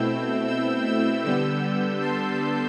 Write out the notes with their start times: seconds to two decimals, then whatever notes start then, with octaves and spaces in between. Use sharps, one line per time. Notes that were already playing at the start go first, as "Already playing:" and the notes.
Already playing: B2 A3 C4 E4 E6 G6
0.48 E6 G6
0.86 E6 G6
1.24 D3 G3 B3 E6 G6
2.01 A5 C6